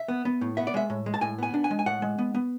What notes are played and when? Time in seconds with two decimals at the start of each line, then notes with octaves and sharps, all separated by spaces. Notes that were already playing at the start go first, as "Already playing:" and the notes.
Already playing: E5
0.08 B3
0.25 B3
0.41 A2
0.57 B3 E5
0.67 D5
0.74 G#3 E5
0.90 A2
1.06 G#3
1.14 A5
1.21 A2 G#5
1.38 B3 G#5
1.54 D4
1.64 G#5
1.71 G#3
1.79 G#5
1.86 A2 F#5
2.02 G#3
2.18 B3
2.35 B3